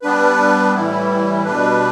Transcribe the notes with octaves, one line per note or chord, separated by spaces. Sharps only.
G3 B3 D4 B4
A2 E3 G3 E4
B2 G3 D4 B4